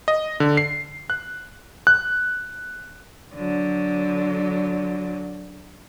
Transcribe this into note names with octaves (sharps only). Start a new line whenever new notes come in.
D#5
D3
C7
F#6
F#6
D3 F#3